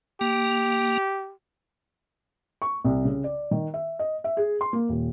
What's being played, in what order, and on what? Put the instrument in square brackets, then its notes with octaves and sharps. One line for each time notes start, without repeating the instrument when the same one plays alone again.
[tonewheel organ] A#3 [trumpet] G4
[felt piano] C#6
C2
C#3
D5
D#3
E5
D#5
E5
G#4
C6
A#3
D#1